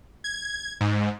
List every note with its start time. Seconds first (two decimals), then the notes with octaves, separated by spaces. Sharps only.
0.24 G#6
0.81 G#2